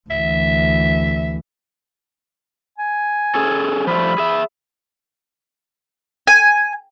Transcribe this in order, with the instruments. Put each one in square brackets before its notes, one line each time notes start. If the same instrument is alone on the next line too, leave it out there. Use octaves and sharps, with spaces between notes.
[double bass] D2 E3 [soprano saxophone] E5
[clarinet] G#5
[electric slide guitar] C#4 G#4 A4
[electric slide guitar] F3 G3 A3 [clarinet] B5
[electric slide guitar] G#4 E5
[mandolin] G#5